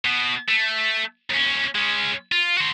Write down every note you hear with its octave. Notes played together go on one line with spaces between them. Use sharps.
B2
A3
D#2 C#4
G#3 C#4
F4
F#4 C5